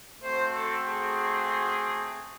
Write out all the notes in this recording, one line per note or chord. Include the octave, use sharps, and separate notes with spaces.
A3 C4 F#4 C5
A4
G#4